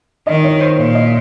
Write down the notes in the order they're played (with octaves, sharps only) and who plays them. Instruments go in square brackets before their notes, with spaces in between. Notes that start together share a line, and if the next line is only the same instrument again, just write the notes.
[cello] D#3 [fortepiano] D#5
[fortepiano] C#5
C5
[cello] A#2 [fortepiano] C#5
[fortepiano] D#5